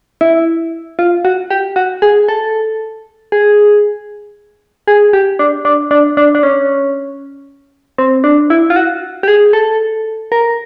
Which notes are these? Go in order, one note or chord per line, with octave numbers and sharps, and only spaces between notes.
E4
F4
F#4
G4
F#4
G#4
A4
G#4
G#4
G4
D4
D4
D4
D4
D4
C#4
C4
D4
E4
F4
F#4
G4
G#4
A4
A#4